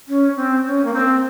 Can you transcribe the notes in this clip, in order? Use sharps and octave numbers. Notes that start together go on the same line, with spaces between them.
C#4
C4
C#4
A#3
C4